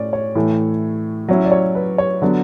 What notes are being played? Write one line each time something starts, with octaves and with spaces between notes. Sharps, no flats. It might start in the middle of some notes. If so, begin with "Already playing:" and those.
Already playing: A2 C#4 D5
C#5
A2 E3 A3
F#3 C#4 E4
D5
C#5
B4
C#5
D3 F#3 B3 D4 B4